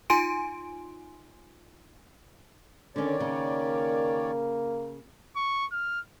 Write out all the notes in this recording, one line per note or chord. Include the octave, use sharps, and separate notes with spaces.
D#4 F4 G#5 C6 D7
D3 D#3 C#4 C#5 D5
C#3 A#3
C#6
F6